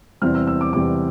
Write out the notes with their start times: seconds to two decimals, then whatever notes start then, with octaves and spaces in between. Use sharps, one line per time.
0.22 E2 C3 G3 C4 E4 F6
0.35 E6
0.47 E6
0.61 D6
0.73 E2 C3 G3 C4 E4 D6